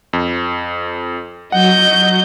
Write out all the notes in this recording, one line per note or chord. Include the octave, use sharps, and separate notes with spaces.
F2
F#3 D#5 F#5 G6